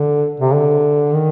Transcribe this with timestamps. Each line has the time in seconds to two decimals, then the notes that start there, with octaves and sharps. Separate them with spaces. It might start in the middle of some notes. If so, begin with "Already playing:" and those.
Already playing: D3
0.40 C3
0.54 D3
1.14 D#3